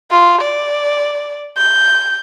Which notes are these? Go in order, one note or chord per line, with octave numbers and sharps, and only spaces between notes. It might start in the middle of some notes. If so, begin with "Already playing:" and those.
F4
D5
G6